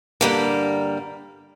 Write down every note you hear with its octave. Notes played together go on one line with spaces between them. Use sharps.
G2 D3 G3 A#3